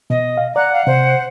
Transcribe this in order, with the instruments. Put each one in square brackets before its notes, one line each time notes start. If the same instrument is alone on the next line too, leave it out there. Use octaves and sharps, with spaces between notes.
[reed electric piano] B2 [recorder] D#5
[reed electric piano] F5
[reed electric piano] D5 [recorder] F#5 [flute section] A#5 F#6
[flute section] F5
[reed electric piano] C3 [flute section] C5